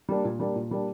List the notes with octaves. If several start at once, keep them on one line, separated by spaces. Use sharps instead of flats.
G3 A#3 D4
A#2
G3 A#3 D4
A#2
G3 A#3 D4